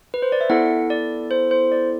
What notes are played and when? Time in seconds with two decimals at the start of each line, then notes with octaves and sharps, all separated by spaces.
0.14 B4
0.22 C5
0.32 D5
0.41 E5
0.50 B3 E4 A4 F#5
0.90 D5
1.31 C5
1.51 C5
1.72 D5